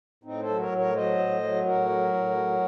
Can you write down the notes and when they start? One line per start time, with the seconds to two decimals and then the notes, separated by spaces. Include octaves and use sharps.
0.24 A2 C4 D#4
0.41 A4 C5
0.48 F#3
0.59 A#4 C#5
0.72 A2
0.78 A#4 C#5
0.95 F#3 C5 D#5
1.18 A2
1.43 F#3
1.66 A2 F#4 A#4
1.89 F#3
2.14 A2
2.37 F#3